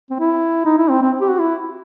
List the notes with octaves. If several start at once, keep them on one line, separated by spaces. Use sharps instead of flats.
C4
E4
D#4
E4
C4
C4
G4
F#4
E4